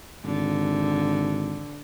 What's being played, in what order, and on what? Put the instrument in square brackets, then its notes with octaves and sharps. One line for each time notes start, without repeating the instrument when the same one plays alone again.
[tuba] G#1 [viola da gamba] D3